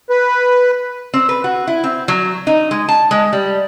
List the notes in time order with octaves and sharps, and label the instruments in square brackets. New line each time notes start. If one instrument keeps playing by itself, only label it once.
[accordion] B4
[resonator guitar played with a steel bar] C4
B4
F#4
E4
C4
F#3
D#4
G#3
A5
G#3
G3